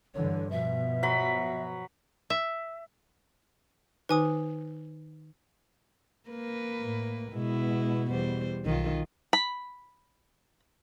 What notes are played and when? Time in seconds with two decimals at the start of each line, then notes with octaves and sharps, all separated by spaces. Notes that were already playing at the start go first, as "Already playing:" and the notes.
0.14 G2 D3 E3 C#5
0.50 B2 F3 E5
1.03 F#3 B5
2.30 E5
4.09 D#3 D#4 B4 G#5 D#6
6.29 A#3 A#4 B4
6.80 A2
7.32 B2 G#3 B3 E4
8.10 E2 G3 C5
8.65 B1 D#3 F4
9.33 B5